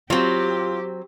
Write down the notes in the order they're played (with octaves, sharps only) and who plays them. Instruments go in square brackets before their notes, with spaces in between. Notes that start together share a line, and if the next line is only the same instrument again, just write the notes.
[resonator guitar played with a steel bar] F#3 C4 [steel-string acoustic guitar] F4 [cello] G4